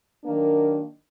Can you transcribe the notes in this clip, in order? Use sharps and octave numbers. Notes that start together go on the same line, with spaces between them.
D#3 F#3 A#3 D4 A#4